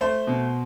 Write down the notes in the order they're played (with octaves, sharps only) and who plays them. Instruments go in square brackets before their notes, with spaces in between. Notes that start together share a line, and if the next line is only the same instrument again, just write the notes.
[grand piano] A3 C5
B2